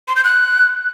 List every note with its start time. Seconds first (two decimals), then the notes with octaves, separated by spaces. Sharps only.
0.08 C6
0.16 G6
0.24 F#6